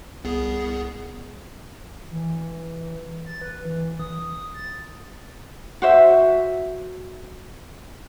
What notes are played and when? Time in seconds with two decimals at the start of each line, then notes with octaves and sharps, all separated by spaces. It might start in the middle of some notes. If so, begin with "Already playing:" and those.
0.24 C2 B3 G#4
2.11 E3
3.25 A6
3.42 B4
3.65 E3
3.99 D#6
4.54 A6
5.82 F#4 C5 E5